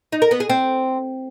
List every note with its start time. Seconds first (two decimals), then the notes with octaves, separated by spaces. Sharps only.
0.12 D#4
0.22 A#4
0.31 B3
0.40 G#4
0.50 C4